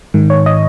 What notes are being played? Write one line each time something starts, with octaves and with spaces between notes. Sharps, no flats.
G#2 D#3
C#5
D#5